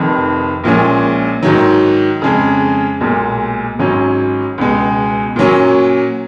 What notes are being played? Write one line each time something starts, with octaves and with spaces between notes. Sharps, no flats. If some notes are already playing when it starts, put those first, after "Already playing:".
Already playing: F1 F2 D#3
A#1 A#2 F3 G#3 C#4
G#2 D#3 F#3
F2 C#3 G#3
B1 A#2 G#3
G#1 G#2 F#3 C#4
C#2 B2 G#3
A#2 F#3 C#4